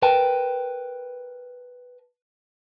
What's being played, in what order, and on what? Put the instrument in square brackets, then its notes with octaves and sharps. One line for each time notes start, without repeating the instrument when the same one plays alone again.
[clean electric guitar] A#4 B4 G5 A5